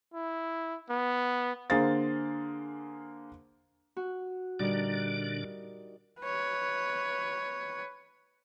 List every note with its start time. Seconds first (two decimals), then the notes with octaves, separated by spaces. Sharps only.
0.14 E4
0.89 B3
1.70 D3 A#3 G#4 C5 F5 A6
3.97 F#4
4.59 A#2 D3 G3 D4 D#4 A#4
6.21 B4 C#5